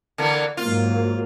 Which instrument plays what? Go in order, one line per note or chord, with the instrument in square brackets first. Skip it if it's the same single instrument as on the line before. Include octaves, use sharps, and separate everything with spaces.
[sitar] D3 E3 A#3
[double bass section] G#2 F#3 A#3 [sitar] F4